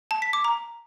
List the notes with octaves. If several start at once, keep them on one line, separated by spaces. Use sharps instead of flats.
A5
B6
D6
A#5